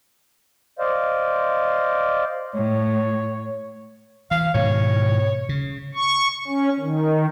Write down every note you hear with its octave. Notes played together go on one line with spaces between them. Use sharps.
C5 D5 D#5 F5
A2 C#5
E3 F5
G#2 B2 D#3 C#5
C#3
C#6
C#4
D#3